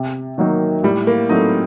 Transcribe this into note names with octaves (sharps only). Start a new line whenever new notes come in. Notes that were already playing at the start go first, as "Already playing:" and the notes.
Already playing: C3
D#3 F#3 A#3 D#4
A2 G3
A#3
F#3 A3 C4 D#4